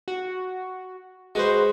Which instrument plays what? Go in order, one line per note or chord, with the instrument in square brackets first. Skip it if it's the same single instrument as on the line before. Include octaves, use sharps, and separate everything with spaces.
[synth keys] F#4
[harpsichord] G#3 [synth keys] F#4 B4 C5